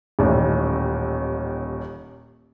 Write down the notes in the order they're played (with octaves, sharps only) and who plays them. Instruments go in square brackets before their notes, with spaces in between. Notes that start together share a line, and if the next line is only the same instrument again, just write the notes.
[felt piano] D#1 A1 D#2